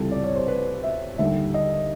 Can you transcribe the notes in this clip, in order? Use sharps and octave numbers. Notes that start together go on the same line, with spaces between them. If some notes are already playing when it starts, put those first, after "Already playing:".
Already playing: C#2 C3 E3 G3 A4
D5
C#5
C5
B4
E5
D#2 D3 G3 E5
D#5